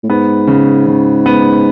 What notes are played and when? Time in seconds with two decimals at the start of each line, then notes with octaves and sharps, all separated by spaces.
0.03 A2
0.09 G#2 B3
0.47 C#3
0.87 C#3
1.26 B3